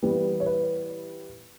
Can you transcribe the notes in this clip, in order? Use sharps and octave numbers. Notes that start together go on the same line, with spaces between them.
E3 G3 B3
C#5
B4